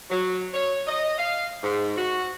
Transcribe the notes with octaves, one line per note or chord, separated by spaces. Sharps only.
F#3
C#5
D#5
F5
G#2
F#4